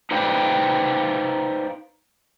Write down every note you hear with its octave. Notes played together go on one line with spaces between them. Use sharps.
D#4 B4 C5 D5 F5 G5